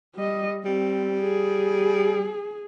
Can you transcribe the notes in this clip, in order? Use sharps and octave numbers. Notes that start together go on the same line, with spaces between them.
G3 D#5
G3 C4
G#4